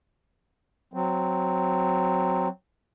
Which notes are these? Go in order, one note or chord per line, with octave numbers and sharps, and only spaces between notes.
F#3 C4